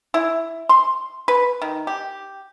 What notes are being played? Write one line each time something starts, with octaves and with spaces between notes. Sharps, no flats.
E4
C6
B4
D#3
G4